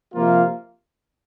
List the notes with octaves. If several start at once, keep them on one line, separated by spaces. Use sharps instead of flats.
C3 F3 A#3 F4